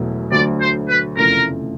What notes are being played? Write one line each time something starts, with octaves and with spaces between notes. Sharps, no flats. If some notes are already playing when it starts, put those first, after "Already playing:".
Already playing: E1 E2 B2 F#3 A3
D2 D3 F#3 A3 D5
C5
B4
F1 E2 C#3 F3 A3 A#4